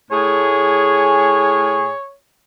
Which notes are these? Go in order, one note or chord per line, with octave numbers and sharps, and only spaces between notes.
A2 A3 G#4 C#5